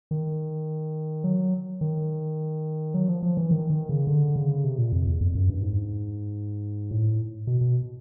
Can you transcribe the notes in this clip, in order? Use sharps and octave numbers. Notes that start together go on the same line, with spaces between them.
D#3
F#3
D#3
F#3
F3
F3
E3
D#3
D#3
C#3
D3
C#3
C3
A#2
F2
E2
F2
F#2
G2
G#2
A2
B2
B2